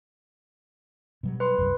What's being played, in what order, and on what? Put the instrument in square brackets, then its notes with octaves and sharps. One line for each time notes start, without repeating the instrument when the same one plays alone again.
[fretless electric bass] B2 F#3 G3
[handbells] B4 C6
[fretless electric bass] C2 F#2